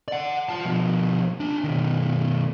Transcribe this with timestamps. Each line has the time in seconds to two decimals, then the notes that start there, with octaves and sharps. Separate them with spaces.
0.08 D5 F#5
0.49 F4 A5
0.65 B2 F3
1.40 D4 G#5
1.64 B2 D#3